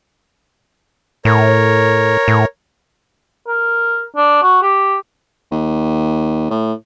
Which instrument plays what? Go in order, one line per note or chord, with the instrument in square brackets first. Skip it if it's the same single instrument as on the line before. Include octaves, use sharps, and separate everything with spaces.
[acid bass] A2 [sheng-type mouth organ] A#4 C#5
[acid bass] A2
[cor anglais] A#4
D4
F#4
G4
[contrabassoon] D#2
A2